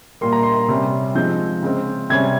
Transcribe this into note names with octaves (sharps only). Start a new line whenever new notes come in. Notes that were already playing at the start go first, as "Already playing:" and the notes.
A#2 G3 A#3 C6
A#5
C6
C3 G3 C#4
F3 G#3 C4 D#4 G6
C#3 G#3 C4
C3 G3 C#4 G#6